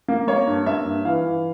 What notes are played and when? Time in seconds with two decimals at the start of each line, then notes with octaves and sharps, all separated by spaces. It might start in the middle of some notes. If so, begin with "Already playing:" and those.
0.08 A#3
0.28 A#3 C#5
0.47 G2
0.66 A#3 E5
0.86 G2
1.05 E3 F5
1.25 E3